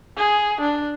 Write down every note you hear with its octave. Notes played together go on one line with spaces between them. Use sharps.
G#4
D4